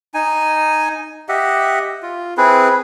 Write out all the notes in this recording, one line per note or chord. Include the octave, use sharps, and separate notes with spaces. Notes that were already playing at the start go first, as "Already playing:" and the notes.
D#4 G#5
G4 D#5 E5 F#5
F4
C4 E4 G#4 B4